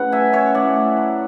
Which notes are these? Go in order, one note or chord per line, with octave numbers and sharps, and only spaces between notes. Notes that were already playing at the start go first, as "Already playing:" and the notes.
Already playing: C#3 A3 B3 E4 F#5
F#3 E5 G#5
C#4 C#5 E5
A2 D5 F#5
A3
F#3